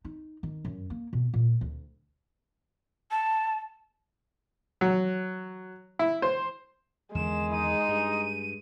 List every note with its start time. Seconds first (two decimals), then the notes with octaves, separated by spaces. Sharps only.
0.05 D#4
0.43 D#3
0.65 F#2
0.90 A#3
1.13 B2
1.34 A#2
1.61 D2
3.11 A5
4.81 F#3
5.99 E4
6.22 C5
7.15 E2 D3 D#3 G#3 E7
7.52 D#4 D#7
7.88 G2